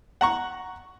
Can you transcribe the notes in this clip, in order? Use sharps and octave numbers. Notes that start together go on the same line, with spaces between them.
F#5 A#5 C#6